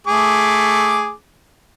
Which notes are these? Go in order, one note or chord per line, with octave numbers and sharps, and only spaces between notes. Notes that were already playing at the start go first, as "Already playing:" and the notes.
A3 G#4 D6